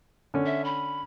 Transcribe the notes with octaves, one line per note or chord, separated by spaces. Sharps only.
D3 C#4
E5
B5